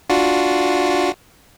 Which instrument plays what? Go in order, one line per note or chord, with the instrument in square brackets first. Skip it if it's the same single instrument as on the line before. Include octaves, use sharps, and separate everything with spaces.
[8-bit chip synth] D4 F4 F#4